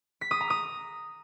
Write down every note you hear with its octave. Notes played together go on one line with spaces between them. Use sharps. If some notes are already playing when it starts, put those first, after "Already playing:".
B6
D#6
A#5
D#6